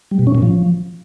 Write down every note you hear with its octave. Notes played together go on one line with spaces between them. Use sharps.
G3
B2
C#4
A#2
F3